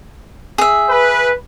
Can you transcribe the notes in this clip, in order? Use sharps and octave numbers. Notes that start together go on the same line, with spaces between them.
G#4 E5
B4